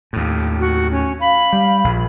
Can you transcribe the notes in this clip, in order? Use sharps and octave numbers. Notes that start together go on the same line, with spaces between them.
D#2 A2
F#4
C#4
F5 B5
G3
A#1